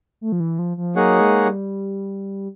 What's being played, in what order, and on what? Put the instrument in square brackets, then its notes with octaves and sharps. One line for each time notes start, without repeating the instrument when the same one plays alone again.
[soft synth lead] A3
F3
E3
F3
F3
[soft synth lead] F#3 [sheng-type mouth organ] A#3 D#4 G#4 C#5 F#5
[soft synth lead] G#3
G3